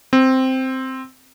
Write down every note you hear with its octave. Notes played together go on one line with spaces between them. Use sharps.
C4